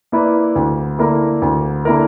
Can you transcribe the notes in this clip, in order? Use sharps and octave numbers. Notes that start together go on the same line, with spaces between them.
A#3 E4 B4 D5
D2
D3 A#3 E4 A#4
D2
D3 A#3 E4 A#4